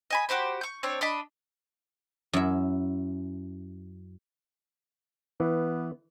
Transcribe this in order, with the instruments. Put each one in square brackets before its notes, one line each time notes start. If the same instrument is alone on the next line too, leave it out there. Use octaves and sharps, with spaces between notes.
[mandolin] D#5 G#5 B5
F#4 G4 C5 B5
C#6 G6
C4 D4 C#5
D4 D#5 B5
[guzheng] F#2 E4
[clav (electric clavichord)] E3 [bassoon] B3